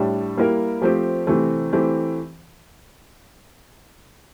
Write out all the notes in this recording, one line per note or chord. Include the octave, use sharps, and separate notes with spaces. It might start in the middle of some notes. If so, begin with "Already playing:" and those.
Already playing: A2 G3 D4
G3 A#3 E4 A#4
F3 A3 C4 G4 C5
C3 E3 A3 C4
E3 A3 C4 G4